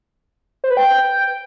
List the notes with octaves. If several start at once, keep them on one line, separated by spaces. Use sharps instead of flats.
C5
B4
G5